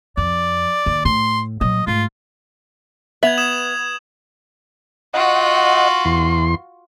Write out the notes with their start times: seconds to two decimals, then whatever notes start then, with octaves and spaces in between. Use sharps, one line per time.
0.17 F2 D5
0.86 D#2
1.05 A2 C6
1.61 A#2 F#3 D#5
1.87 G#2 A3 F4
3.23 B3 E5 G#6 F7 F#7
3.38 D#6 G#6 E7
5.14 F4 F#4 D#5 F#5
6.05 E2 C6